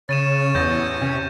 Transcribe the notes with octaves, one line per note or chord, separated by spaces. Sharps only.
C#3 C#5 A6 D#7 E7
A1 E2 G6 A#6
C3 C#4